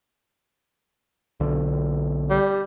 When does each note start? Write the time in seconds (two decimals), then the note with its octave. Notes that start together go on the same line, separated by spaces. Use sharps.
1.40 B1 D3
2.30 G3